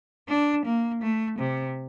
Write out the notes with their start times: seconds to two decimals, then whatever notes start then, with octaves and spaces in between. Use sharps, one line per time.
0.29 D4
0.65 A#3
1.02 A3
1.39 C3